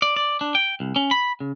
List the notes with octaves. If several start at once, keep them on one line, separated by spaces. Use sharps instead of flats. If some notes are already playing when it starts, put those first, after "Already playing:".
D5
D5
D4
G5
C2
C#4
B5
C#3